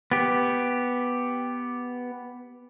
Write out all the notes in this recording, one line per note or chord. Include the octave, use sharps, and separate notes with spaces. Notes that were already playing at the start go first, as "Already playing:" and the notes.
B3 G4